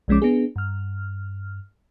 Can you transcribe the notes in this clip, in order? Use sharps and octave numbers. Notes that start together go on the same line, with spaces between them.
B1 F3 G#3 C#4 D6
B3 D4 G#4
G2 F6